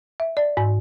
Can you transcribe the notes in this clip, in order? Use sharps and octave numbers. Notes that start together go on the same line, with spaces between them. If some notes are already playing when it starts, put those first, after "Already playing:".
E5
D5
G#2